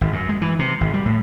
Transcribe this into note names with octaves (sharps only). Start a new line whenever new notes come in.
G#1
F#2
G#3
E3
C3
G#1
G3
A2